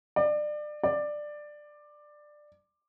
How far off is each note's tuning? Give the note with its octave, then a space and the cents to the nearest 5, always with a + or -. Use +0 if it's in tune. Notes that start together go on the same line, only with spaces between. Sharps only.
D5 +30
D5 +15